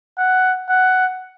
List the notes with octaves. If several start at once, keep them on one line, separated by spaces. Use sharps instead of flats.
F#5
F#5